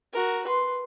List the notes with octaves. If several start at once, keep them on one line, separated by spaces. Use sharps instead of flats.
F#4 A#4
B4 C6